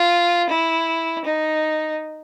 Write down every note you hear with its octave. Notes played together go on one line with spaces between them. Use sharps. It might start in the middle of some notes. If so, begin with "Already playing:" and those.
Already playing: F4
E4
D#4